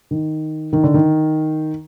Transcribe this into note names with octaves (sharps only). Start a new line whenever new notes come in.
D#3
D#3
D3
D#3